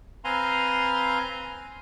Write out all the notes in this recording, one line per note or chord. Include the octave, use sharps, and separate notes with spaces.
C4 B4 F5 G#5 A#5 C6